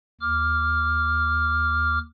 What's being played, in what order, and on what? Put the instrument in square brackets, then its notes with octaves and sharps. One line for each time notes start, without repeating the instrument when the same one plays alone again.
[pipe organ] D#2 D6 F6